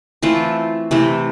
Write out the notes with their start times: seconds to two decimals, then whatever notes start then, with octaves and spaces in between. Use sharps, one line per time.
0.22 E3 A3 C4 F4
0.91 C3 E3 A3